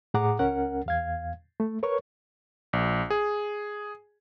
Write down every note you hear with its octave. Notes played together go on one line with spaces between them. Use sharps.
A2 G#4 F#5 A#5 D6
C#2 C#4 A#4 F#5
E2 F5 G#6
A3
A#4 B4 C#5 C#6
A#1
G#4